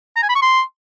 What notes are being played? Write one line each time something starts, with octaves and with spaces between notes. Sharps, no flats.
A#5
G#5
B5
C#6
C6